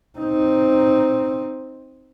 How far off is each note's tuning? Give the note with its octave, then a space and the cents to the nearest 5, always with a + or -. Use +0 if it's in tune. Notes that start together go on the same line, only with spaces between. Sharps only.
C4 +0 D#4 +0